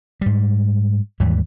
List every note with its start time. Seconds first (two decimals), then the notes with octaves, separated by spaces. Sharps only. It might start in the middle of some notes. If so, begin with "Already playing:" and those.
0.21 G#2 G3
1.20 D#2 G#2 E3 G3